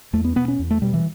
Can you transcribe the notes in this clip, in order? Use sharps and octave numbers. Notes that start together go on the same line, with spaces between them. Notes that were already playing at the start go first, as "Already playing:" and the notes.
E2 A3
B3
B2 B3
C#4
E2
A3
B2 G3
E3